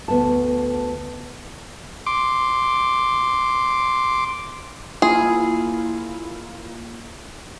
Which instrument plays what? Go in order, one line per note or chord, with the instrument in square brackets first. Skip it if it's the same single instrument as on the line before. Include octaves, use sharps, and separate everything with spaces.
[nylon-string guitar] D2 B3 A5
[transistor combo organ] C6 D6
[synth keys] A#3 E4 F4 [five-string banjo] G#4